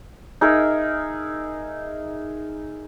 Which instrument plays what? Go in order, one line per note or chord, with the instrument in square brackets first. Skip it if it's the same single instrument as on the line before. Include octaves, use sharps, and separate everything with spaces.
[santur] D#4 G#4 A#4 E5